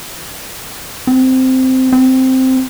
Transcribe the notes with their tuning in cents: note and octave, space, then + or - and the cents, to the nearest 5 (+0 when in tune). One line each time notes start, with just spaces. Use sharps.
C4 -10
C4 -5